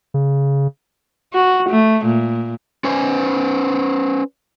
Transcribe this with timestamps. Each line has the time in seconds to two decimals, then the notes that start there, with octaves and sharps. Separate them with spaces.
0.14 C#3
1.34 F#4
1.69 A3
2.05 A#2
2.84 C#4 B4 C5 G#5